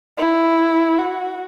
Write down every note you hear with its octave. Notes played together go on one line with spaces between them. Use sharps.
E4
F#4